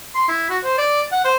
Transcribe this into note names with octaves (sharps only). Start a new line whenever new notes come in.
C6
E4
F#4
C5
D5
F#5
C5